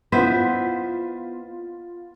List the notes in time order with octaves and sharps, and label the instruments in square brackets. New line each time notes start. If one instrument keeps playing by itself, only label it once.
[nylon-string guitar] B3 [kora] E4 C5 D#5 [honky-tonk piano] F4 B6